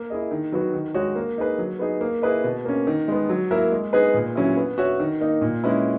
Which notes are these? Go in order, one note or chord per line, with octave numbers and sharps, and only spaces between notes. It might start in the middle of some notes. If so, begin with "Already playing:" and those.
Already playing: A#3
E4 G#4 D#5
D#3
F#3 B3 F#4
D#3
G#3 D#4 F#4 C#5
A#3
D#4 G#4 B4
F#3
B3 D#4 G#4
A#3
E4 G#4 B4 D#5
B2
A#3 C#4
D#3
G#3 B3
F#3
A#3 E4 A#4 E5
G#3
B3 D#4 G#4 B4
A#2
F#3 C#4 E4
B3
F#4 C#5 E5
D#3
A#3 D#4
A#2
G#3 C#4 E4 B4